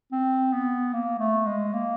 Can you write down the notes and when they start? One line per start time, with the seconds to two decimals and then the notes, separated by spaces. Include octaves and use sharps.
0.12 C4
0.53 B3
0.93 A#3
1.19 A3
1.46 G#3
1.73 A#3